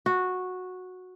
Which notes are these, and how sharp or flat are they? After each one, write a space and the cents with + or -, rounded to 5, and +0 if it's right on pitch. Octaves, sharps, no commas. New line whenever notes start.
F#4 -10